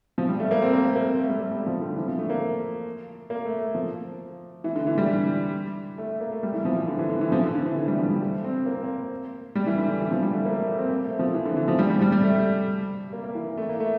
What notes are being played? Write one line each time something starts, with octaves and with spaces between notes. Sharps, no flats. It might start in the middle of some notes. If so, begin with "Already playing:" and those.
F3
G3
A3
A#3
C4
A#3
A3
A#3
C4
A3
G3
A3
G3
F3
D3
E3
F3
A3
A#3
A#3
A3
A3
F3
E3
D3
E3
G3
A3
A3
A#3
A3
G3
E3
F3
E3
D3
E3
D3
E3
F3
D3
D3
E3
E3
G3
F3
G3
A3
C4
A#3
C4
A#3
G3
E3
D3
D3
E3
F3
G3
A3
A#3
A3
A#3
C4
A#3
A3
F3
E3
D3
E3
F3
G3
G3
G3
G3
A3
A#3
A#3
E3
A3
A#3
A3